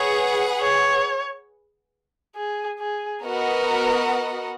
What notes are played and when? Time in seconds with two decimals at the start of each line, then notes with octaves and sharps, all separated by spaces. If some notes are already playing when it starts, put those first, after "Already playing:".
Already playing: G#4 B4 C#5 F#5
0.61 C#5
2.36 G#4
2.79 G#4
3.24 B3 F#4 A#4 B4 D#5 F#5